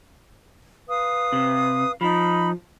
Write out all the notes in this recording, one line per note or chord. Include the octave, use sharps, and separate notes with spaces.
B4 F5 D#6
C3
F3 D#4 B5